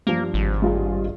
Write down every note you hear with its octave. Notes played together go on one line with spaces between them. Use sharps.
G2 F3 A#3
G#1
G2 F4 G#4